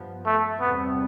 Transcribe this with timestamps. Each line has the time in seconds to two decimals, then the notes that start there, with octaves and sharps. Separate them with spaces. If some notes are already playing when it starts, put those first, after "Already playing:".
Already playing: G2 F3 B3
0.26 A3
0.61 E2 C3 G3 B3